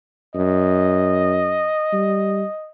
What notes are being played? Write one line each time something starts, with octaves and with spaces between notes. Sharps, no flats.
F#2 D#5
G3